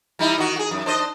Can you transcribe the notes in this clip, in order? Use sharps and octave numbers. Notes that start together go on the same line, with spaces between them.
G3 D#4 E4
D#3 F#4
F#4 G#4
F#2
D4 C5 D#5